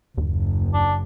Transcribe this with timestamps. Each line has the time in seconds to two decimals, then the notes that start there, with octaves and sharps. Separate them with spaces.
0.18 F#1 D#2
0.74 D4